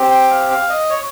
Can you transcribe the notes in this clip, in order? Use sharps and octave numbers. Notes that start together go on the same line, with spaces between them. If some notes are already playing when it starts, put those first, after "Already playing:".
Already playing: C4 G4
G5
F5
F5
D#5
C#5